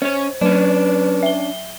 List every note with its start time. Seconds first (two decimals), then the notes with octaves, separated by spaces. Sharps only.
0.02 C#4 C5 C#5
0.41 F#3 C#4 D4 B4
1.23 E5 G7